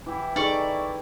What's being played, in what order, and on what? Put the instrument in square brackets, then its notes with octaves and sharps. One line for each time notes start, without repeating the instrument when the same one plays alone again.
[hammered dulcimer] E3 G4 [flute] E4
[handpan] D#4 G#4 A4 [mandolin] D5 C#6